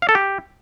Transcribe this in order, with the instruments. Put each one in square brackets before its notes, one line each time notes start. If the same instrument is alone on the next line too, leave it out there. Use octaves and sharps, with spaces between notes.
[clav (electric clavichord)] F5
A4
G4